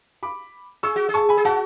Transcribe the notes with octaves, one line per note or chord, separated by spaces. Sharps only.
B5 D6
G#4 C#6 E6
F#4
G#4
A5 C#6
G#5 B5
G#4
F#4 F#5 A5